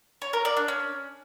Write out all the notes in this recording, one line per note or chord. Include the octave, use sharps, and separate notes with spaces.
C#5
A#4
D5
D4
C#4